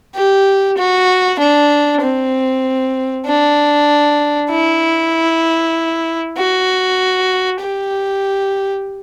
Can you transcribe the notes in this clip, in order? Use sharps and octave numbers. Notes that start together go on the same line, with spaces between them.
G4
F#4
D4
C4
D4
E4
F#4
G4